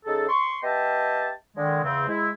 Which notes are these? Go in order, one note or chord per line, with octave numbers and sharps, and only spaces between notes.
C#3 D#4 G#4 A4
C6 C#6
B3 G4 D#5 E5 G5 A5
D3 D#3 G#3
E2 C#3 C4
G#3 E4